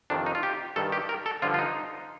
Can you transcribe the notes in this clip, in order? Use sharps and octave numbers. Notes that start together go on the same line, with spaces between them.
F2 C3 D#3 D4
D#4
F4
G4
G2 D#3 A4
G4
A#4
A4
G2 D3 F3 F4
F4
D#4